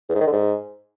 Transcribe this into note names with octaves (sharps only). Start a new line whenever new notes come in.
E2
G#2
D#3
D3
G#2